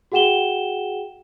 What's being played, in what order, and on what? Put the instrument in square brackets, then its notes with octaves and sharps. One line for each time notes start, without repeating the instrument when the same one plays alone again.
[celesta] F#4 G#4 F#5 G5 E7 G7